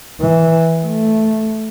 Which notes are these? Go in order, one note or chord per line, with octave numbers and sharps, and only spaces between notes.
E3
A3